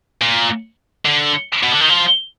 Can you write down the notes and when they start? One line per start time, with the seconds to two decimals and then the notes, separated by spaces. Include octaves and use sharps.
0.21 A#2
1.05 D3
1.63 B2
1.72 D3
1.81 D#3
1.89 F3